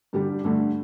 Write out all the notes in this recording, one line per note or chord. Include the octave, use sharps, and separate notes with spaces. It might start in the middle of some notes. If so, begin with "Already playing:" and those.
G2 D3 G3 D4 G4
G2 D3 A3